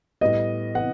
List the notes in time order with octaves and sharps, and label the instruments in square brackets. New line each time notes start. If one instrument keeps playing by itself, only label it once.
[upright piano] A2 G3 B3 [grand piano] D#5
[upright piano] C3 E3 B3 [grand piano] F#5